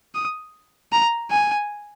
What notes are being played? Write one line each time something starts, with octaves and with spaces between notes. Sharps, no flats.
D#6
A#5
G#5